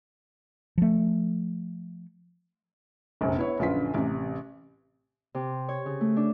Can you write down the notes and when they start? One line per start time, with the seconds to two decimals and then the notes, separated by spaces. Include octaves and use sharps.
0.78 F3 A3
3.21 F1 A#1 F#2
3.36 B3 E4 C#5
3.59 A#1 F#2 D3 F4 B4 B6
3.94 A1 C3
5.35 C3
5.69 C#5
5.86 C#3
6.01 A3
6.16 D4